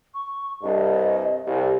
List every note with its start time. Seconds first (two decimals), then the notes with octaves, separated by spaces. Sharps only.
0.14 C#6
0.63 C2 G2 D#5
1.46 C2 G4